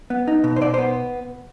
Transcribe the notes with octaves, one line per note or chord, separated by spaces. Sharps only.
B3
D#4
B2
C5
B2 D5
C5
B3